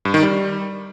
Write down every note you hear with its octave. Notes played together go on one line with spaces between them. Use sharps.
G2
D#3
G3